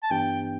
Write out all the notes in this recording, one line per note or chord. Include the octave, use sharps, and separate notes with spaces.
A5
G2 E3 B3 D4 G4 G5